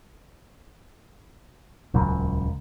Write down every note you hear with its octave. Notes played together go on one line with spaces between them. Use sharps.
D#1 C#2 F#2